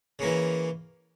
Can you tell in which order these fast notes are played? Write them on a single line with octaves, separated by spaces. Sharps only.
C#3 A#3 E3